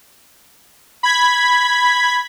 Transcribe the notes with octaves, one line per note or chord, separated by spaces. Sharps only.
B5 G#6 B6